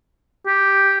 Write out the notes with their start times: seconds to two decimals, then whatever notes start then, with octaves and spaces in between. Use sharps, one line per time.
0.47 G4